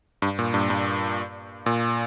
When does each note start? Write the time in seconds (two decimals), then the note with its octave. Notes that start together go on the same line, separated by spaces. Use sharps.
0.22 G2
0.39 A#2
0.54 G2
0.70 G2
1.66 A#2